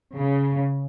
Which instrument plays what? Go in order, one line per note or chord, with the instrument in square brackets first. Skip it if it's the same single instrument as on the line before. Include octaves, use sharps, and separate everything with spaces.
[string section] C#3